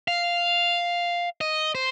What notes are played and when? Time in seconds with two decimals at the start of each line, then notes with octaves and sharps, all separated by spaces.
0.08 F5
1.41 D#5
1.75 C5